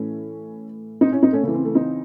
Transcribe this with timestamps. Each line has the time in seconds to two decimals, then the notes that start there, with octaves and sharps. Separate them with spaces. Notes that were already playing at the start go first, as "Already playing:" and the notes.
Already playing: A2 E3 A3 C#4
1.01 C4 D#4
1.12 C#4 E4
1.23 C4 D#4
1.33 A3 C#4
1.43 C#3 A3
1.48 E3
1.54 C4
1.65 A3
1.74 C4 D#4